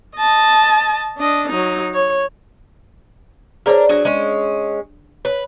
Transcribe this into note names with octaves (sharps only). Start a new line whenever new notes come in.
D#5 A5
D4 D#5
F#3 D#4
C#5
D4 G#4 A#4 C5 C#5
F#3 D4 G#4 D5
G#3 C#4
B4 C#5